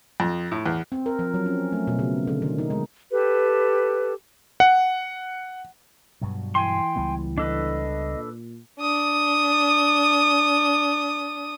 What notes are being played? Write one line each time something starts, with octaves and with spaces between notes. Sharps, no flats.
F2
A2
E2
C4
A#4
F3
F#3
C#4
A3
B2
C#3
D3
D#3
D#4
G#3
G4 A4 B4
F#5
G2 B2 F#3
E3 G5 G#5 C6
C#2 G3 B3
D4 A4 B4 D#5
A#2
D4 D#6